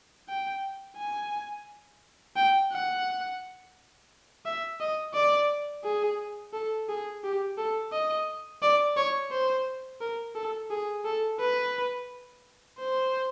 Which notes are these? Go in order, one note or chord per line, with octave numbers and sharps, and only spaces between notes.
G5
G#5
G5
F#5
E5
D#5
D5
G#4
A4
G#4
G4
A4
D#5
D5
C#5
C5
A#4
A4
G#4
A4
B4
C5